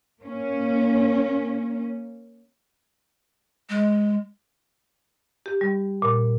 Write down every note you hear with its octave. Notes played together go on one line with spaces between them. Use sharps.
A#3 C#4
G#3
G4
G3
A#2